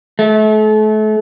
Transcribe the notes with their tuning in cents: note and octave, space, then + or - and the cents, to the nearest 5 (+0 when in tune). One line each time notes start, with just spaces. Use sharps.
A3 -35